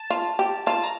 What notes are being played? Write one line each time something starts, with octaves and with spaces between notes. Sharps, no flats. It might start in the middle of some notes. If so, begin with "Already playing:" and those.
Already playing: A5
F4
G4
F4 A5
A#5